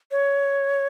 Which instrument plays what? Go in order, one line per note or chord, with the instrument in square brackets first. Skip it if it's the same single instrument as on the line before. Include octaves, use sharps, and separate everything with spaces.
[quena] C#5